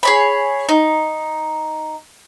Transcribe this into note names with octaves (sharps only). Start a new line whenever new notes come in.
G#4 C#5 B5
D#4